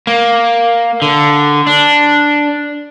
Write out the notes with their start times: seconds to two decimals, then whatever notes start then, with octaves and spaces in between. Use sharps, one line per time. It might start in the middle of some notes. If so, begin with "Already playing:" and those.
0.07 A#3
1.02 D3
1.67 D4